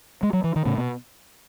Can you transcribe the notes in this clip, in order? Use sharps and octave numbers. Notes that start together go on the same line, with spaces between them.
G#3
F#3
E3
D#3
A2 C#3
B2